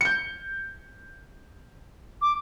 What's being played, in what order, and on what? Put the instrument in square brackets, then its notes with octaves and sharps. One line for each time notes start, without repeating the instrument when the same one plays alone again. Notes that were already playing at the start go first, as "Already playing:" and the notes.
[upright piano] G6 C#7
[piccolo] D6